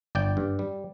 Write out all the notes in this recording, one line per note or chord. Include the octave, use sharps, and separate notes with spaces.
G1 D5 G5
G2
G3